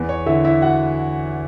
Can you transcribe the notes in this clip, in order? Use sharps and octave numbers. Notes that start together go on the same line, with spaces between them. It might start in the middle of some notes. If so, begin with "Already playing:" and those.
Already playing: E2 B4
C#5
D3 E4 E5
E4 E5
F#4 F#5